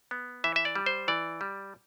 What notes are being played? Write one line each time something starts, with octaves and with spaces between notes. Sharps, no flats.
B3
E3 E5
E5
D5
G3
C5
E3 D5
G3